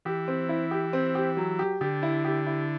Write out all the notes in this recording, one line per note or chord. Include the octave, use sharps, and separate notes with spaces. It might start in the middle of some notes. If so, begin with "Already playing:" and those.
E3 G4
C4
E4
G4
C4
G4
F#3
G4
D3 G4
E4
G4
E4